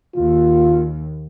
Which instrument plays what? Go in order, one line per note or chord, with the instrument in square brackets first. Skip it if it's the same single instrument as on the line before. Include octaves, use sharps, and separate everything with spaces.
[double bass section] D#2 [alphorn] F4